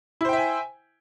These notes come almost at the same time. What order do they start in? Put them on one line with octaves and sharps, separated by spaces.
E4 C5 G5 E5 G#5